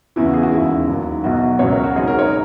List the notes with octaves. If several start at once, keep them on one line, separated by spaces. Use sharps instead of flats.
E2 C#3 E3 E4
F#4
G#4
F#4
E1 D#2 C#3 E4
D#2 D#3 F#3
B1 B2 F#3 F#4
C#2 B2 F#3 C#5
A#4
F#4
G#1 G#2 F#3 G#4
A#4
C#5